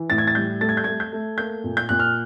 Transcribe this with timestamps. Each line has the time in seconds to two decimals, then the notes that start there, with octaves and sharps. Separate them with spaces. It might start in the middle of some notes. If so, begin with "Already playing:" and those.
Already playing: E3
0.10 A2 A6
0.18 G#6
0.27 A6
0.35 G3 G6
0.61 A3 A6
0.69 G#6
0.77 G6
0.84 G#6
0.87 A3
1.00 G6
1.13 A3
1.38 A#3 G6
1.64 A#2
1.77 G6
1.89 A#2 F#6
1.99 F6